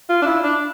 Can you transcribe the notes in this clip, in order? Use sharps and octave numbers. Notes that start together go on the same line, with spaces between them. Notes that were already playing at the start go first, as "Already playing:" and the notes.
F4
D4
E4
D4